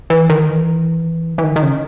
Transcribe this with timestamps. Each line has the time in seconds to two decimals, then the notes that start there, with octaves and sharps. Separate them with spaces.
0.10 E3
0.30 D#3
0.49 E3
1.38 E3
1.43 D#3
1.56 D#3
1.63 C#3